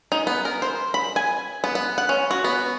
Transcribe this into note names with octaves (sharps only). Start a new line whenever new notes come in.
D#4
B3
A#4
C5
B5
G#5
B3
B3
F#5
C#4
F#4
B3